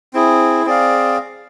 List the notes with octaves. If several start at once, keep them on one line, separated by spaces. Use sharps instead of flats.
C4 E4 G#4
C4 G#4 D5 F5